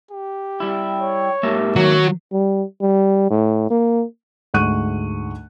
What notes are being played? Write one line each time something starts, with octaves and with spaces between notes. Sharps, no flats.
G4
G3 E4 G5
C#5
G#2 A#3 G4 E5
D#3 F#3 C#5
G3
G3
A2
A#3
D2 G#2 F#5 C#6 F#6 D#7